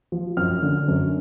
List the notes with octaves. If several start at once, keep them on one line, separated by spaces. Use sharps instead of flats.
F3
F#2 F6
D3
F#2